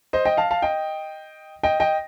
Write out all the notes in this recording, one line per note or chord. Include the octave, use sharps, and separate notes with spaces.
C5 D#5
D#5 G5
F5 A5
F5 A5
D#5 G5
D#5 G5
D#5 G5